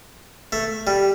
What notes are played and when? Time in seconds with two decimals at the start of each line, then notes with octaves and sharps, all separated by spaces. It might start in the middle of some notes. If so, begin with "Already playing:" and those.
0.52 A3
0.87 G3